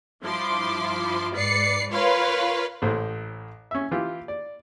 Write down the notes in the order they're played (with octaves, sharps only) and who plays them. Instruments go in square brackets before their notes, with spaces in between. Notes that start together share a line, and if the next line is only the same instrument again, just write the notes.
[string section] G2 F3 E4 C6 D6
G#2 B4 D5 C7 C#7
F4 A#4 B4 C#5 F5 C6
[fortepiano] A1 A2 C5
C#4 E5
E3 F4 G4
D5